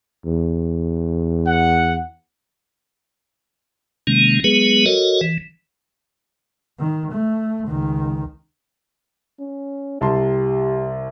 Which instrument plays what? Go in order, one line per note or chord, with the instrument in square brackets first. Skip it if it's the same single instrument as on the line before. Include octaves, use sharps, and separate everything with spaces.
[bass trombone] E2
[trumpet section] F#5
[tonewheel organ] C3 D#3 G#3 A#3 C#4
F#3 G#3 B3 G#4 B4
F#4 A4 A#4 C#5 D#5
E3
[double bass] D#3
A3
C#2 D#3
[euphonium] C#4
[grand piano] C2 A5 C6 [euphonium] G4